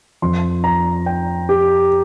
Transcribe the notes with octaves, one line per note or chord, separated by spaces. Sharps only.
F2 F3 C6
A#5
G5
G4